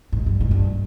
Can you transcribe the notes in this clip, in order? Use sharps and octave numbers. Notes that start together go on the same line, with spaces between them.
G#2
G2
G#2
G2